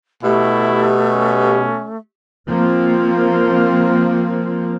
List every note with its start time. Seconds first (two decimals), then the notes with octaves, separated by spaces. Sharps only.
0.23 B2 A3 E4 G4
1.12 C#4
2.48 F3 A#3 C4